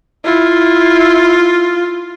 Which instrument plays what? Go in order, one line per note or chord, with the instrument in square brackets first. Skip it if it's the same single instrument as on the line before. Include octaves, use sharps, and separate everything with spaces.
[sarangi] E4 [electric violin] F4